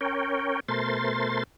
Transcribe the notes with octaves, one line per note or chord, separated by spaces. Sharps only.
C#4 A#4 C#5 G5
B2 A3 A#4 C5 C6 A6